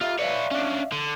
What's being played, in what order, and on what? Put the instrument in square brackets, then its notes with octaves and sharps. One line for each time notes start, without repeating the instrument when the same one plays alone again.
[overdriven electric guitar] F4 [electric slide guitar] G4 E5 F5
[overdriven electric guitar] B4 C#5 [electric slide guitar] D5 E5 F5
[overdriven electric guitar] C#4 D4
D3